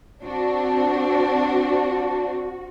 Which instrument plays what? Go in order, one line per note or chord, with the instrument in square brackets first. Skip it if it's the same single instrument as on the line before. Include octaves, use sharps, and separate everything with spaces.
[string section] C4 D4 [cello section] F#4